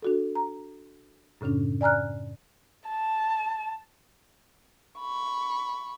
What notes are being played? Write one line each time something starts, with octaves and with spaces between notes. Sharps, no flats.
D4 F#4 A4
A#5
F#2 A2 C#3 C#4 D4
D5 G#5 A#5 F6 F#6
A5
B5 C#6